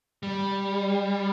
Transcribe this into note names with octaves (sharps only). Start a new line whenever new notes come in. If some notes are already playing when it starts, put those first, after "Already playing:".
G3